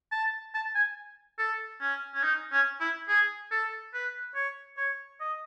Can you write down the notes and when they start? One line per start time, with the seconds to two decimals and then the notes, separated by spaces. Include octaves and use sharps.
0.12 A5
0.54 A5
0.75 G#5
1.39 A4
1.81 C#4
2.14 C#4
2.23 D#4
2.52 C#4
2.80 E4
3.09 G#4
3.51 A4
3.94 B4
4.35 C#5
4.77 C#5
5.20 D#5